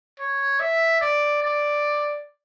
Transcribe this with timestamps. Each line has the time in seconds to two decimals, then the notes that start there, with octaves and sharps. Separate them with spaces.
0.19 C#5
0.60 E5
1.01 D5
1.43 D5